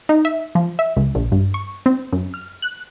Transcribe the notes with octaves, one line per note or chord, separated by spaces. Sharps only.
D#4
E5
F3
E5
C#2
A#1
G2
C#6
C4
F#2
F6
F#6